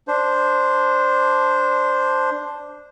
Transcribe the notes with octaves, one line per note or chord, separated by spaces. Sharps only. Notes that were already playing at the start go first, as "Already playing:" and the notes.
D4 C5